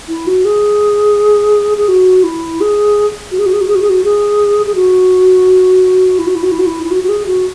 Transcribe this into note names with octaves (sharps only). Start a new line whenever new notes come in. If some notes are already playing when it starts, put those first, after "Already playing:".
E4
F#4
G#4
G#4
F#4
E4
G#4
F#4
G#4
F#4
G#4
F#4
G#4
F#4
G#4
F#4
G#4
G#4
F#4
E4
F#4
E4
F#4
E4
F#4
E4
E4
F#4
F#4
G#4
F#4